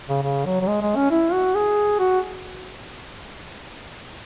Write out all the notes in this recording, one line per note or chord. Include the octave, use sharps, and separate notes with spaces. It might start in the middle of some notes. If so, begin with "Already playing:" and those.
C#3
C#3
F#3
F#3
G#3
G#3
C#4
E4
F#4
G#4
F#4